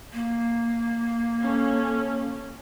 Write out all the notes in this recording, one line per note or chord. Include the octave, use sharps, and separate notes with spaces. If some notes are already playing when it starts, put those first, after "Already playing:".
A#3
C#4 A4